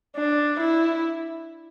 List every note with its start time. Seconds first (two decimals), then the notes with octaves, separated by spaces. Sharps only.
0.16 D4
0.60 E4